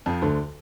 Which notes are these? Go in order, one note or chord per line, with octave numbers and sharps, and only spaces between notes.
F2 F3
D2 D3